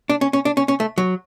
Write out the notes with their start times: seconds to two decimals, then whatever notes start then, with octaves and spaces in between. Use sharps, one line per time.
0.10 D4
0.21 C#4
0.33 C#4
0.45 D4
0.57 C#4
0.68 C#4
0.80 A3
0.98 F#3